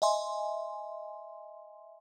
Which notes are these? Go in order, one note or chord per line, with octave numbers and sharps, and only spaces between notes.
D#5 E5 G#5 C6